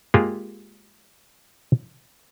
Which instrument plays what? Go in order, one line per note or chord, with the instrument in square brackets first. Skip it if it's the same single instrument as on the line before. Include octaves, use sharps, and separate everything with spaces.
[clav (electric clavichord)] G#3 A#3 F4 G4 G#4